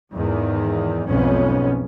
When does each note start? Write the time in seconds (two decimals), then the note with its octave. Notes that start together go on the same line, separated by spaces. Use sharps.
0.12 E2 G#2 D#3
1.08 B1 F2 G#2 B3 C#4